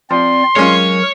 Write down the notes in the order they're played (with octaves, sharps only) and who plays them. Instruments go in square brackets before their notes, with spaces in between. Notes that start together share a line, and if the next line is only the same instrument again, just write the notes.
[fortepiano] F3 [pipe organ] C4 D5 [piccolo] C6
[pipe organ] F#3 A#4 [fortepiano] G#3 C#4 F4 [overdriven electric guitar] C#5